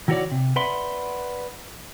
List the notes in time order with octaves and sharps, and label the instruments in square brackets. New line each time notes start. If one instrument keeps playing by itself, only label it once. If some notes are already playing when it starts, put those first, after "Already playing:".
[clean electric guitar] D#3 E4 F#4 G#4 C#5 D5
C3
B4 D5 E5 F#5 B5 C6